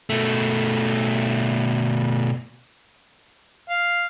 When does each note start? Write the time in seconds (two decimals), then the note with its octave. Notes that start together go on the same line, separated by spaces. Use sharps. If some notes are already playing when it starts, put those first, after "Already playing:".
0.10 B2 A3
3.70 F5